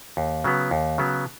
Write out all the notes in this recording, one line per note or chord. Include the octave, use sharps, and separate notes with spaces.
D#2
C#3 F#3 B3
D#2
C#3 F#3 B3